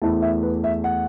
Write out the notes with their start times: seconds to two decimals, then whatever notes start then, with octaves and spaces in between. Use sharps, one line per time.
0.02 E2 E3 A3 A5
0.22 E5
0.43 B4
0.64 E5
0.84 F#5